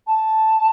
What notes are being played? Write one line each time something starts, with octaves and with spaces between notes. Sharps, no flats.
A5